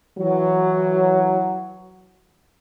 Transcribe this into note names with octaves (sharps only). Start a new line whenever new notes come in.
E3 F#3